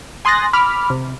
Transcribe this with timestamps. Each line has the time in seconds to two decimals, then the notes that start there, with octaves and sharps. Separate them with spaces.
0.25 G#5 C6 D#6 F#6 A6 A#6
0.53 B5 D6 F6
0.90 C3